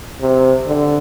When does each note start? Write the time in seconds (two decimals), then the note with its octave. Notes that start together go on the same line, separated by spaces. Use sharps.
0.20 C3
0.66 D3